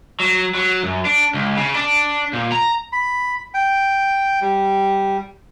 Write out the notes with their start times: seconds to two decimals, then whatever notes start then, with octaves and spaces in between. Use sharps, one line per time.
0.20 F#3
0.55 F#3
0.84 F#2
1.05 D4
1.34 C#2
1.57 C#3
1.75 D4
2.33 A#2
2.52 A#5
2.93 B5
3.54 G5
4.41 G3